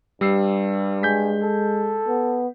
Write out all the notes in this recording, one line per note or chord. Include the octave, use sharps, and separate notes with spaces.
G2 G3 E6 C7
G#3 G#5 G6 B6
A4
B3